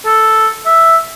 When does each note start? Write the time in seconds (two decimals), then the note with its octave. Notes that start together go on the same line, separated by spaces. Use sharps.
0.05 A4
0.66 E5